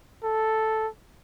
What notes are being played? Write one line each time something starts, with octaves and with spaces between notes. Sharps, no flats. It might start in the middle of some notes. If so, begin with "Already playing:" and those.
A4